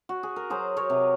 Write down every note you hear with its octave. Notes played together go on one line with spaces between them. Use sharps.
F#4
G#4
A#4
F#3 G#4 C5
A#4 C#5
C3